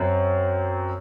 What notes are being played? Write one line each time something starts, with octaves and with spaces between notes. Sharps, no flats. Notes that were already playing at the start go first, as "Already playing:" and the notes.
Already playing: F#2 C4